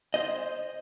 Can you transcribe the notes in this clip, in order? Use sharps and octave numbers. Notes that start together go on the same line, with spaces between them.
C5 D#5